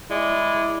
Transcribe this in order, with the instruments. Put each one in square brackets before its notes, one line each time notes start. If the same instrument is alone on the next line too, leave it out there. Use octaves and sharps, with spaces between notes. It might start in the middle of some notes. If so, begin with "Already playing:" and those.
[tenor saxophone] G#3 [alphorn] E4 [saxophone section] D5